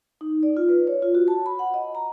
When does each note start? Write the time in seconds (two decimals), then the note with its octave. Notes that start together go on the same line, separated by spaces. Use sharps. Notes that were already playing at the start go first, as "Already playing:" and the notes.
0.21 D#4
0.43 D5
0.57 F4
0.69 B4
0.87 C#5
1.02 F4
1.15 F#4
1.28 A5
1.46 B5
1.59 F#5
1.74 D#5
1.95 A#5